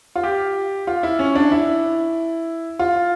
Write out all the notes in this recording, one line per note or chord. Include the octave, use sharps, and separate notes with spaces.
F4
G4
F4
E4
C#4
D4
E4
F4